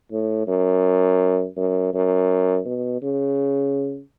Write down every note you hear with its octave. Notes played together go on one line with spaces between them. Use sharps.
A2
F#2
F#2
F#2
B2
C#3